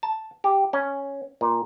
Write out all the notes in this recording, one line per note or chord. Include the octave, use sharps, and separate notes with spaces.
A5
G4
C#4
A#2